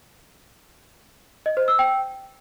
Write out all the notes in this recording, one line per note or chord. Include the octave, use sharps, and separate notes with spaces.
D#5
C5
E6
G5